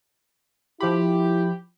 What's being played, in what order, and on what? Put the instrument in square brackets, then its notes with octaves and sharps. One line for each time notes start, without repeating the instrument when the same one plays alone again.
[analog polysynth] F3 B5 [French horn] E4 [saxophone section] G4